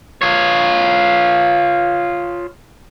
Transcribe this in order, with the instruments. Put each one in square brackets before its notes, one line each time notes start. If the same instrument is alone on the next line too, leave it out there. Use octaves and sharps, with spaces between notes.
[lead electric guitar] F4 C#5